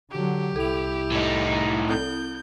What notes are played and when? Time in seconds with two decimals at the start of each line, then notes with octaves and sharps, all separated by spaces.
0.11 D3 F#3 G4
0.56 C2 E4 A4 F7
1.12 A2 D#4
1.89 C4 E4 A4 G6